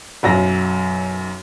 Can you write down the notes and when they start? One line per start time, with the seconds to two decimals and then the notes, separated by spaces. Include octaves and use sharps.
0.23 B1 F#2 A#6